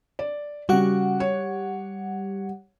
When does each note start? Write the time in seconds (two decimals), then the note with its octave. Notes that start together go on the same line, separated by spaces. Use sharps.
0.19 D5
0.69 C#3 G3 F#4 G4 F#5
1.20 C#5